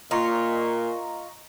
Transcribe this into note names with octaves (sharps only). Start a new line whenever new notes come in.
A#2 F4 D#5 A#5 C#6